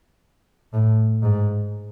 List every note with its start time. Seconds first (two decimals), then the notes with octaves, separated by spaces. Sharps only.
0.73 A2
1.22 G#2